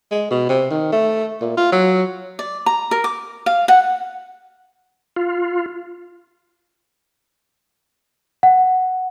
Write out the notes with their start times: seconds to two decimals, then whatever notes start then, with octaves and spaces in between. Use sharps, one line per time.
0.11 G#3
0.31 B2
0.50 C3
0.71 D#3
0.92 A3
1.41 A#2
1.57 F4
1.72 F#3
2.39 D5
2.66 A#5
2.91 A#4
3.04 D6
3.46 F5
3.68 F#5
5.16 F4
8.43 F#5